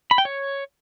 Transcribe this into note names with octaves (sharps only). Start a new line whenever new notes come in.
B5
G5
C#5